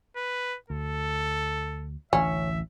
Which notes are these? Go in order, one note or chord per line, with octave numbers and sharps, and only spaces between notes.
B4
D2 A4
A1 D2 E3 C#4 E5